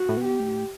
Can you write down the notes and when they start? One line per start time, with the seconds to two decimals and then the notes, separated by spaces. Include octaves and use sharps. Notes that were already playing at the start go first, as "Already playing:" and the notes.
Already playing: F#4
0.09 A2
0.17 B2
0.24 G4
0.40 A2